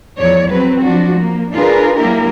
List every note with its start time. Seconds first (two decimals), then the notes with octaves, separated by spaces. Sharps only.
0.18 E2 F3 C#5 D5
0.49 F#3 C4 B4
0.82 F3 D4 F#4
1.20 A#3
1.53 D4 F4 G#4 A#4 B4
1.98 F#3 A#3 D4 E4 G4 A#4